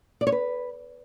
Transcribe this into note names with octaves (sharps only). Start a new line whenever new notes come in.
D5
C#5
B4